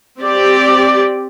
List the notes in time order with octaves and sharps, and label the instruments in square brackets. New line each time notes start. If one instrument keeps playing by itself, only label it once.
[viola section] C4 G4 D5